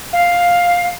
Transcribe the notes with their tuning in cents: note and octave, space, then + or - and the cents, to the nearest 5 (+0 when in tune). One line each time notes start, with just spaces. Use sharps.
F5 +5